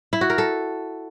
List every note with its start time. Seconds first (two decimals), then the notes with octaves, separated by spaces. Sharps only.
0.13 E4
0.21 F#4
0.30 A#4
0.38 A4